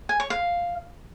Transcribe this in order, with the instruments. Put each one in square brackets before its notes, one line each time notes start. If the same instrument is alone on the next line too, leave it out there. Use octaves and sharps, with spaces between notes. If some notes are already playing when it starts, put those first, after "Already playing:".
[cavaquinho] G#5
C#5
F5